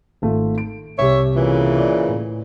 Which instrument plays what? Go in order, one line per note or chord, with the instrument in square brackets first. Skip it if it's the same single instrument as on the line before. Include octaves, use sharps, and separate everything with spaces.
[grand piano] G#1 A3 F4
D7
[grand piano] C2 G4 [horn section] C#5 E5
[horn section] A#2 C#3 E3
[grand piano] D5
A2